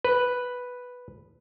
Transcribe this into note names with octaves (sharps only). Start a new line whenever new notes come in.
B4